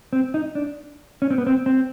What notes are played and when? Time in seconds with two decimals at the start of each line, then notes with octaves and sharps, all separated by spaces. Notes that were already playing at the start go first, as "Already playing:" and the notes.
0.13 C4
0.34 D#4
0.55 D4
1.22 C#4
1.30 C4
1.38 B3
1.47 C4
1.66 C4